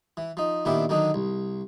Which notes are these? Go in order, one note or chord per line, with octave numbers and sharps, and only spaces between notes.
E3
F3 D#4
A#2 D#3 B3 D4 E4 G4
D3 D#3 F#3 D4 D#4
C2